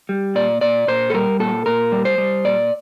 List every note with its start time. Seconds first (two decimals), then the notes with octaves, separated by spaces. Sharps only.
0.09 G3
0.35 A#2 D5
0.61 A#2 D5
0.88 A#2 C5
1.10 A4
1.14 G3 A#4
1.40 A#2 A4
1.66 A#2 A#4
1.92 G3
2.05 C5
2.18 G3
2.45 A#2 D5